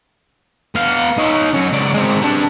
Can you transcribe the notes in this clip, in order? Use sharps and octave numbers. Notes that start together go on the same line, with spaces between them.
B3 F5
D#4 C#5
F#3 C#4
C#2 D5
G#3 C4
G3 D4